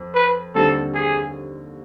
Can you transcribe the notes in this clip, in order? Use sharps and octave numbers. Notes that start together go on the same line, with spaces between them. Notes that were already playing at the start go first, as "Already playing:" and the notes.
Already playing: F2
B4
D#2 D3 G3 C4 A4
G#4